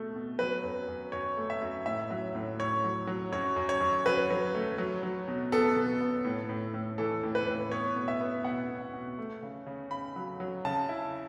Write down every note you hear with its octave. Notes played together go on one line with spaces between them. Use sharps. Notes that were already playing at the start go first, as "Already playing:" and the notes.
Already playing: B2 A3
B2
F#3 B4
F#2
F#2
F#2 C#5
A3
E5
F#2
A2 E5
F#3
A2
A2 C#5
F#3
F#3
F#2 C#5
F#2
C#5
F#2
F#3 B4
F#3
A3
F#3
F#3
B2
B3 A4
B2
B3
A2
A2
A2
E3 A4
A2
B4
A2
B3 C#5
B2
E5
B3
B2 F#5
B2
B2
A3
C#3
C#3
C#3 B5
F#3
F#3
C#3 A5
E4